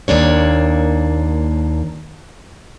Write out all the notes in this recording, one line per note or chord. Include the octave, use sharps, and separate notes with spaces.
D#2 A#3 D4 C#5